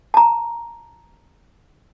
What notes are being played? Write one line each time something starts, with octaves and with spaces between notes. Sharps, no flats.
A5 A#5